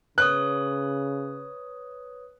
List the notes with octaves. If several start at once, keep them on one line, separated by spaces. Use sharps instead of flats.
C#3 B4 C#5 D#6 F#6